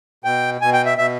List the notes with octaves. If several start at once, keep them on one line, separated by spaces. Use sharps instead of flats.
B2 G5
B2 G#5
G5
E5
B2 E5